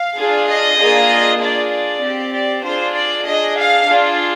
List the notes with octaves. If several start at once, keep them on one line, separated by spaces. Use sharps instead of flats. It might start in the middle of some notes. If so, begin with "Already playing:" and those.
Already playing: F5
D4 F4 G#4
D#5
A#3 D4 F4 G#4
D4 F4 G#4 D5
D5
C4 G4
D5
D4 F4 G#4 C5
D5
D4 G#4 D#5
F5
D4 F4 G#4